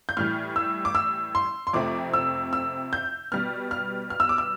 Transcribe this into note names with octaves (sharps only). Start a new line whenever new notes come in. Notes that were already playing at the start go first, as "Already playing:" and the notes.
G6
A2 E3 G3 F6
E6
D6
E6
C6
C6
F2 C3 F3 A3 C4 D6
E6
E6
G6
B2 G3 B3 F6
F6
F6
E6
D6
E6